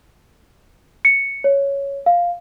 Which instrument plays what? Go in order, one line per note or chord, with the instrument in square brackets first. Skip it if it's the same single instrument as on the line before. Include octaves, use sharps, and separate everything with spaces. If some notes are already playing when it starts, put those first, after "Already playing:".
[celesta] C#7
C#5
F5